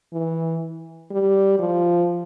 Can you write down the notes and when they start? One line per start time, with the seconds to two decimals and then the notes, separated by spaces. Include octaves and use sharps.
0.13 E3
1.11 G3
1.59 F3